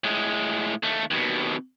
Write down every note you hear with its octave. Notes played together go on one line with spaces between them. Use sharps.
A2 G#3
D#2 A3
D#2 B2